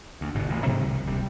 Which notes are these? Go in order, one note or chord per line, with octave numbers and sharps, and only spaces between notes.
D2
G1 G#2 B2
A1 A#2
G#2 C3 D#3 G3
C2
D1 C3 G3